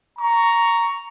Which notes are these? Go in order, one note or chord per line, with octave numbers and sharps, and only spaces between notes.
A#5 C#6